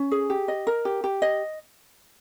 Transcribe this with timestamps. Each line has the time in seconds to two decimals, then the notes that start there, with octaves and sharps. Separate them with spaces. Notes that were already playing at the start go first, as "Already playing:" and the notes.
Already playing: C#4
0.11 G#4
0.30 G4
0.48 D#5
0.67 A#4
0.85 G4
1.04 G4
1.22 D#5